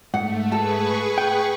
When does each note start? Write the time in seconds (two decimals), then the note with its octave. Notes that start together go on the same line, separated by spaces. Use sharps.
0.14 G#2 A3 F#5
0.52 G#4 A4 B4 C#6
1.18 G5